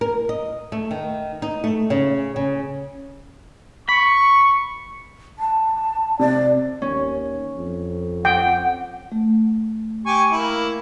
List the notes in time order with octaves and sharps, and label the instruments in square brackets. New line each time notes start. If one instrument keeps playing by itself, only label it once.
[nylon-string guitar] A#4
D#5
A3
D#3
D#4
A3
C#3
C#3
[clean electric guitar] B5 [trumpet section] C#6
[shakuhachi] A5
[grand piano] C3 [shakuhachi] D5
[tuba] D#2 [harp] C#4
[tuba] F2
[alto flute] F#5 [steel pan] G5
[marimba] A3
[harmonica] G4 G#5 C#6
A#3 E4